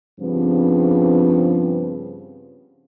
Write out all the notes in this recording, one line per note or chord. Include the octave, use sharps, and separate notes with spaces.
G2 C#3 F3 B3 C4